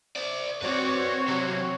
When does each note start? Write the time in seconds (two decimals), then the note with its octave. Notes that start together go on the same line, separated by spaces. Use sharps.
0.16 C5 D5
0.62 C4 F#4 B4 C#5 D5
1.28 C3 F#3